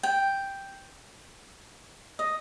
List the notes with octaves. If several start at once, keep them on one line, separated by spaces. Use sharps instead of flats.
G5
D#5